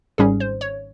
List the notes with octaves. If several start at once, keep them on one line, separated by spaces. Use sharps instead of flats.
G#1 G#2 G3 C#4 G#4
C5
C#5